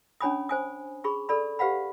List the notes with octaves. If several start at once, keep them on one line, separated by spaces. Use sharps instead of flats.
C#4 D4 C#5 G#5 B5 D#6
C5 G#5 D#6
G#4 B5 C#6
A4 D5 B5
G4 B4 F5 F#5 B5